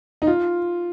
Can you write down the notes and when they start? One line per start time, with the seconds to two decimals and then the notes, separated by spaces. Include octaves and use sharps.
0.22 D#4
0.27 F4